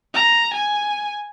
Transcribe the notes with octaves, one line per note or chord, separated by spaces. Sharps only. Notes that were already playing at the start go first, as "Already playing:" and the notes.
A#5
G#5